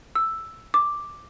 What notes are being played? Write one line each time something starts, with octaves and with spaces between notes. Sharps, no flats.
E6
D6